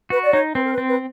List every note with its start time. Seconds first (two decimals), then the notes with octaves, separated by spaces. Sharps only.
0.10 F#4 B4
0.23 D5
0.32 D#4 C#5
0.55 C4 B4
0.64 A#4
0.72 B4
0.78 C4
0.88 B4